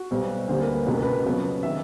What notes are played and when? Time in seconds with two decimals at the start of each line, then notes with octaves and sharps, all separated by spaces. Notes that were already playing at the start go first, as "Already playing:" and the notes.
Already playing: F#4
0.11 B1 B2 G3 C4
0.48 D2 D3 G3 A#3 C5
0.61 A#4
0.67 B4
0.86 C#2 B2 G#3 B4
0.94 A#4
1.02 B4
1.25 F2 C#3 F#3 B3
1.63 D#3 E5